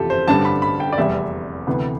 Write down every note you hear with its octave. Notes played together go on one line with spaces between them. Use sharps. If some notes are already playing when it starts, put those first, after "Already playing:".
Already playing: F1 F2 C3 E3 F4 G4 A4
C5
A1 G2 D3 G3 C4 A5
B5
B5
G5
D5
F1 E2 C3 G3 E5
D2 C3 E3 B3